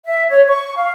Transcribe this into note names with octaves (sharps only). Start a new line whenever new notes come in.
E5
C#5
C#6
F5